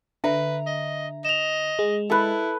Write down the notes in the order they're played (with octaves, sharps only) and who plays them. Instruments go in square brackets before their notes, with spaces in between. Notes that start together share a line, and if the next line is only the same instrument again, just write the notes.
[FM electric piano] D3 [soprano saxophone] B4 [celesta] E5 [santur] A#5
[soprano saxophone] D#5
[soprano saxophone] D#5 [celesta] E7 F7
[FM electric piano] G#3
[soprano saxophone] E4 [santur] A4 B4